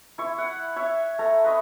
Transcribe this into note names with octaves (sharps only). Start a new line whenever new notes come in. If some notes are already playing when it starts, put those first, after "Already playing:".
E4 C#6
F#5
C#5 E5
A3 A#5
B4 D#5 C#6